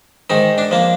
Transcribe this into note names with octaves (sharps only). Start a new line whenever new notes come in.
G#2 D#3 D#4
D4
F3 A#3